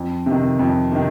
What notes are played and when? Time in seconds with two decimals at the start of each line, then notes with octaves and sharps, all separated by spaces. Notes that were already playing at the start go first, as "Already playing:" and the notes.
Already playing: F2
0.26 C3 D#3
0.59 F2
0.92 C3 D#3